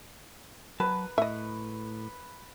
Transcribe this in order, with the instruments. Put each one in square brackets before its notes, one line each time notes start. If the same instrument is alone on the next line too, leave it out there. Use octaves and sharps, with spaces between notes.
[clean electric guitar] F#3 A5 [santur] B4
[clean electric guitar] A2 [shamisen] D#5 E5